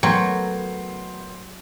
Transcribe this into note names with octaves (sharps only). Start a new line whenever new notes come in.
F#3 A3 B3 A#4 G5 C6